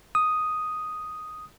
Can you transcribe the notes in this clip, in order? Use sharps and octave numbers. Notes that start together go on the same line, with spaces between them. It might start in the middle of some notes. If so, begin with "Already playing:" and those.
D#6